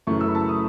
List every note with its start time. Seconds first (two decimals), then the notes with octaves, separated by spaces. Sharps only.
0.07 F#2 C#3 E3 A3 C#6
0.21 E6
0.28 B5
0.35 A5
0.49 D#6